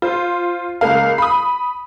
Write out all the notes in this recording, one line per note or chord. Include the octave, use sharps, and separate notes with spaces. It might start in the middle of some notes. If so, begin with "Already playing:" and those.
F4 C5
C#2 A#3 F5
B5 D#6